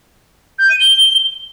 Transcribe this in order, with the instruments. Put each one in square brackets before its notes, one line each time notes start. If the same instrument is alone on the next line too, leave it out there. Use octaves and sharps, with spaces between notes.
[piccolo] G6
D#7
G7